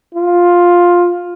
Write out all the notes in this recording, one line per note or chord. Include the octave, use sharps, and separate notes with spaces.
F4